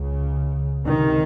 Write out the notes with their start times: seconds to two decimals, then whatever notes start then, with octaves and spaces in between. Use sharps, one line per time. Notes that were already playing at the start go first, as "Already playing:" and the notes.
Already playing: C#2 C#3
0.85 C#2 C3 D#3